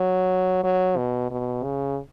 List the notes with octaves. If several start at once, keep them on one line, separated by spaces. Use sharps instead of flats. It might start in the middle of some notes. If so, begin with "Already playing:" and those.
Already playing: F#3
F#3
B2
B2
C#3